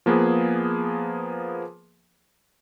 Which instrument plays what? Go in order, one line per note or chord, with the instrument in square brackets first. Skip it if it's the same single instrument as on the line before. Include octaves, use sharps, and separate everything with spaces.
[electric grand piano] F3 A#3 B3 G#4 B4